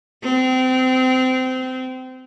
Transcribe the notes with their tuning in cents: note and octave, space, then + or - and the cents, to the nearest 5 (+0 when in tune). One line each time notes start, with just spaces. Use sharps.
C4 -25